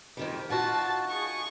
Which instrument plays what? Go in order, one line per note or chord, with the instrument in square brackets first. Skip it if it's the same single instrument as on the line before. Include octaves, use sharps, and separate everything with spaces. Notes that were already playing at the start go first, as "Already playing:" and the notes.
[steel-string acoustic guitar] F2 D#3 G3
[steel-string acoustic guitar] D#4 F4 F#4 [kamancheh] A5
[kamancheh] G#4 C#6